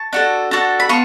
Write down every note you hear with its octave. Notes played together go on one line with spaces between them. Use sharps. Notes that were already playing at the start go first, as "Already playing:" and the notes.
Already playing: A5 C#6
D4 F#4 A4
D4 F#4 A4
B5
B3 F4 A5 C#6